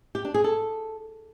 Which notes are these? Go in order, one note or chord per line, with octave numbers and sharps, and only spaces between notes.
G4
D4
G#4
A4